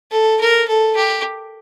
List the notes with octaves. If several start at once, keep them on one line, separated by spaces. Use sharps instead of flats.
A4
A#4
A4
G4